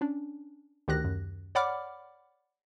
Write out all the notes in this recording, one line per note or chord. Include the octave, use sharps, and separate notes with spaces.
C#4 D4
D2 D#3 G4 F#6 A#6
F#2
C#5 D5 F#5 B5 D6 F6